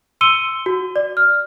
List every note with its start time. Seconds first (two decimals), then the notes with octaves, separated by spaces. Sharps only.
0.21 C6 E6 C#7 D#7 G7
0.66 F#4
0.96 D5
1.17 F6